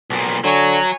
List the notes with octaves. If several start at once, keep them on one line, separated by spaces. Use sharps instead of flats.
B1 A#2
D3 F#3 C#5 G#5